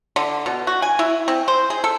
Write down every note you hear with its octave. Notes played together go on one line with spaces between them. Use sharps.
D3
B2
F#4
G#5
E4
C4
C5
G#4
A4